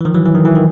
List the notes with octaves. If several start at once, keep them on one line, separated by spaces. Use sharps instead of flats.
E3
D#3 F3
E3 F#3
E3
D#3
E3
D#3